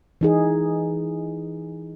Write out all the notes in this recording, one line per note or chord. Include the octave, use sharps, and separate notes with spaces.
E3 D#4 G#4